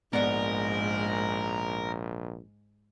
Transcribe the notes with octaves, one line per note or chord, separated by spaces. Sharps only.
A#1 G#2 B3 A#4 D5 F#5